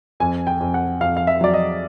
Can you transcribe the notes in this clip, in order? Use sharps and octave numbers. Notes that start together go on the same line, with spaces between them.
F2 G#5
G5
F2
F#5
F2 F5
F5
E5
F#3 D5
D#5